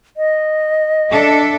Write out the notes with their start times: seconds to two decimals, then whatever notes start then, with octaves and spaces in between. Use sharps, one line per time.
0.17 D#5
1.10 D4 A4 E5